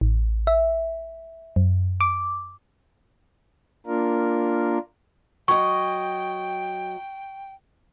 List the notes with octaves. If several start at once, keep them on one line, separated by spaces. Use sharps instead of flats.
A1
E5
F#2
D6
A#3 D4 F4 A#4
F#3 D#5 G5 C#6